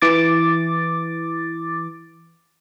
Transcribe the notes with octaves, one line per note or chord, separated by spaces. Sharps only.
E3 D6 A6